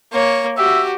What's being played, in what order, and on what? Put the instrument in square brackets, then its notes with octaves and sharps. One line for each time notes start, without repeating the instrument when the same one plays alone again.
[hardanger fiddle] A#3 C#5
[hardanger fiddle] F#4 G4 [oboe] E5